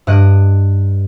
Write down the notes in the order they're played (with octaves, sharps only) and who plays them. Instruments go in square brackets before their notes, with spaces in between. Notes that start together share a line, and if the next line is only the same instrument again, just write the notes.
[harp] G2 D#5 F#6 D7 D#7